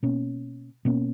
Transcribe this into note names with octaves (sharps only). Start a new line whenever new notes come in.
B2 A#3 C#4
B2 A#3 C#4